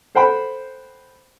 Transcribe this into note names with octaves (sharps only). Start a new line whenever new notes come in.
A4 C5 F#5 G5 B5